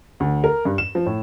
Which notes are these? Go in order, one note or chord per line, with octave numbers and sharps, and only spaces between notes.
D2
A#4
G2
E7
F3
A2